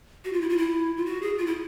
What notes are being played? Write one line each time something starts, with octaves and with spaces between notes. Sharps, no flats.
F#4
F4
E4
F4
E4
F4
F#4
G#4
F4
E4